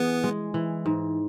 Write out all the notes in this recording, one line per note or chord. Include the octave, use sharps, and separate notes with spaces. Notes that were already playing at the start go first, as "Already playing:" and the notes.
Already playing: E3 B3 G#4
G#3
E3
G#2